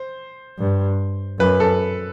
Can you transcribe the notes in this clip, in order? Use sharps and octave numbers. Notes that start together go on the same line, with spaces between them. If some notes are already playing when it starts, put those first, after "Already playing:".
Already playing: C5
G2
F#2 B4
A4